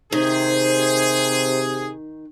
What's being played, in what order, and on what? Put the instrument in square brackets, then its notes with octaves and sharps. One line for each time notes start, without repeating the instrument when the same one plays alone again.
[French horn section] C3 [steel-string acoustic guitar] D#3 [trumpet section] G#4 [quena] C5